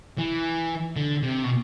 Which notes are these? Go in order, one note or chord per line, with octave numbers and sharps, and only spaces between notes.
E3
D3
C3
B2